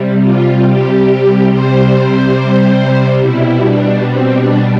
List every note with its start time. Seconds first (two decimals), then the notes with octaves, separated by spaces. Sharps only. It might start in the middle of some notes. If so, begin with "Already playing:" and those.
Already playing: C3 G3
0.23 F4
0.66 G4
1.51 C3 G3 C5
3.21 B2 G3 E4
3.64 D4
4.07 C4
4.36 D4